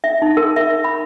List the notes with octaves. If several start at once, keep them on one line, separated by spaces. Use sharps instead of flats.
E5
D#4
A#4
E5
B5